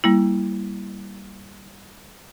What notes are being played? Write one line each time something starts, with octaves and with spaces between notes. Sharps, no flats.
G3 A#3 E4